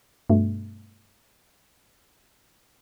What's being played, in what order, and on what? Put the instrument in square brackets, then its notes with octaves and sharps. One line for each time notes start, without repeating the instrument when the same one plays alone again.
[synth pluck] G2 B2 A3